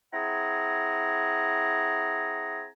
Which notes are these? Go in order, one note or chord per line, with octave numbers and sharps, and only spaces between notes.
C4 E4 G#4 F#5 G#5 A#5